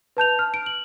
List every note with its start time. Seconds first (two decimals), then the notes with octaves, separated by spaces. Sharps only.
0.17 B4 A5 G6 F7
0.39 F6
0.54 D7
0.66 F#7